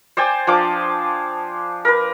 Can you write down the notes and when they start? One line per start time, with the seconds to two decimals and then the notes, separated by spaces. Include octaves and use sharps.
0.17 C5 D5 G5 G#5
0.47 F3 D4 D6
1.85 A#4 B4